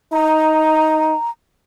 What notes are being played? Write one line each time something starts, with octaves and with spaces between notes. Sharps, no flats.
D#4 A#5